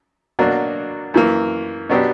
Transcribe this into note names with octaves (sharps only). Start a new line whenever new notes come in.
B2 F#3 A#3 D4 F#4
F#2 E3 A#3
B2 F#3 B3 D4 G4